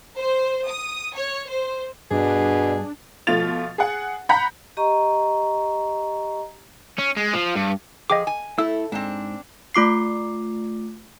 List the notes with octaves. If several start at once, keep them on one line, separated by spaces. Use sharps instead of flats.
C5
D#6
C#5
C5
G2 B2 D4 G#4
B2 F3 A3 F4 A6 F7
G#4 F#5
F#5 A#5 B5 G6 B6
G4 D#5 A#5 C#6
C#4
G#3
F3
G2
F3 G#4 D#5 G5 D6
G#5
A3 E4 E6
G#2 C4 D4
A3 F4 D6 C7